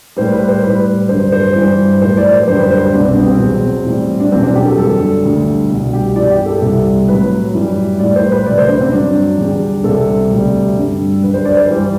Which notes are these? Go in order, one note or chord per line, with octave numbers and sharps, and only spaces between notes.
A2 G3 C5
B4
C5
A2 G3 B4
G2 D3 F#3 C5
C5
G2 E3 G3
A2 F#3 C5
D5
C5
F#2 D3 G3 C5
B4
C5
B4
C2 B2 G3 D4
C4
B3
C4
E2 B2 F#3
A2 E3 G3
D4
E2 B2 F#3 C4
D4
G4
A4
F#2 D3 G3 A4
D2 D3 G3
C2 B2 G3
G4
G2 E3 G3 D5
G4
A4
C2 C3 G3
A2 F#3 B4
F#2 E3 G3
A2 G3 D5
C5
B4
D2 C3 F#3 D5
C5
D4
C4
G2 F#3 D4
E2 D3 G3
C2 C3 G3 A4
D2 C3 G3
G2 D3 G3
F#2 D3 G3 B4
C5
D5
C5
G2 E3 G3